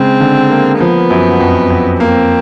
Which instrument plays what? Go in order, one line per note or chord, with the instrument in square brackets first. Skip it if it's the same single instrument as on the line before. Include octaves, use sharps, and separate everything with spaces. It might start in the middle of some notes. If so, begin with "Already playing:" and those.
Already playing: [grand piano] C#3 G#3 [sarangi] C4
[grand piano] D3
A#3
[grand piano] F3 [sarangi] B3
[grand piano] F#2
F2
F2
[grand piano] A#3 [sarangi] C4